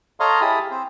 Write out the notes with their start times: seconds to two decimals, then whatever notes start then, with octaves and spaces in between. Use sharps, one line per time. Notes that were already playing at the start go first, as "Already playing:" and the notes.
0.20 A4 C#5 D#5 F5 A#5 C6
0.41 E4 G4 G#4 A5 B5 D#6
0.71 C4 C5